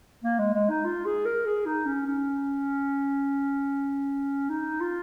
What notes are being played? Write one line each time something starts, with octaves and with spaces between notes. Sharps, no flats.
A#3
G#3
G#3
D#4
F4
G#4
A#4
G#4
D#4
C#4
C#4
D#4
F4